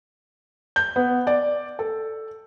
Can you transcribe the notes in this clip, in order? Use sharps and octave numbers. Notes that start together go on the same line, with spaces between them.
G6
B3
D5
A4